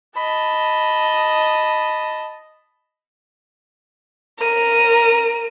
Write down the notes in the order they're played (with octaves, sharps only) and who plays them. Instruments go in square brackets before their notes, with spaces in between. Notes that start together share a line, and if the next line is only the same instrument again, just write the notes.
[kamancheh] D#5 A5 [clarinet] B5
[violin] A#4 D#7